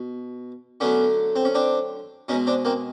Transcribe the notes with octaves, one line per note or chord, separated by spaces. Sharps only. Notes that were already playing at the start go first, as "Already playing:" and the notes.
Already playing: B2
D3 F#3 A3 B3 C#4
C4
C#4
C4 D4
B2 G#3 C#4 D#4
C4 D4
A#3 C4